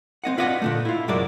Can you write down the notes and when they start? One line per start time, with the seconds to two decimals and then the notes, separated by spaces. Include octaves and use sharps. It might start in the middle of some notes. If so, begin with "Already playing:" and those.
0.24 C4 C#4 D#5 F#5
0.38 F4 B4 D5 D#5 F5 F#5
0.62 A#2 D3 A3
0.85 E4 F4
1.08 C2 F#2 G#3 F#4 A#4 D5